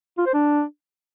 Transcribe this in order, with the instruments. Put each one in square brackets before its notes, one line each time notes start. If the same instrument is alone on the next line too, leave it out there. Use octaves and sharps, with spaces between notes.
[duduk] F4
C5
D4